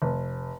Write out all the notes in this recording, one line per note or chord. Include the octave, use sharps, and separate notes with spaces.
F1